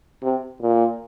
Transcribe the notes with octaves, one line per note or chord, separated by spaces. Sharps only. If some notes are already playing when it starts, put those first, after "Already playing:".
C3
A#2